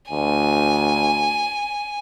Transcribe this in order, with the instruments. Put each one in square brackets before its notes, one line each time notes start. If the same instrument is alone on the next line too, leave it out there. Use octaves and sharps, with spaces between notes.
[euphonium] D2 [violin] G#5